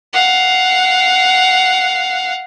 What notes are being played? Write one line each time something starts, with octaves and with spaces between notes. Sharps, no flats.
F5 F#5